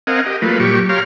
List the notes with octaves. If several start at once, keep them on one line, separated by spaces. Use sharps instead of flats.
C4 A#4 D#5 F5 F#5 G#5
G4 D#5
F#3 A3 A#3 F4 B4
A#2 F#3 G3 G4 C#6
G4 C#5 F5 A#5 C6 F6